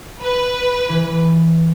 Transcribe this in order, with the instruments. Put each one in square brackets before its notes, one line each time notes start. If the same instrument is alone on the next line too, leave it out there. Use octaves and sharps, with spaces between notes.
[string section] B4
[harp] E3